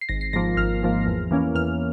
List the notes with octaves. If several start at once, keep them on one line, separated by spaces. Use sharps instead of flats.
C7
G#1 A#6
C7
G#2 F3 A#3 A#6
G#1 F6
G#2 F3 A#3
E2
E3 A#3 C#4
E2 F6